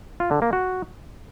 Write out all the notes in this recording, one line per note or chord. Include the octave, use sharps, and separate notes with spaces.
F4
D3
A#3
F#4